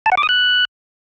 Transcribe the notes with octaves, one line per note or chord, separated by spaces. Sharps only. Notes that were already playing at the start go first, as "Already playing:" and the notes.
A5
F#5
D6
D#6
F#6